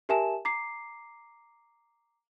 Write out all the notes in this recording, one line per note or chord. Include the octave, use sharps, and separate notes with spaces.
G4 A#4 E5 G#5 A5 E7
A#5 D6 C7